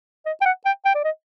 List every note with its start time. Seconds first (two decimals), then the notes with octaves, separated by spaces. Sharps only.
0.26 D#5
0.41 G5
0.45 F#5
0.65 G5
0.85 G5
0.95 D5
1.04 D#5